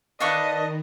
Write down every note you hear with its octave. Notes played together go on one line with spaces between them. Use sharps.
D#3 D4 D#4 B4 D#5 F5 C#6 D6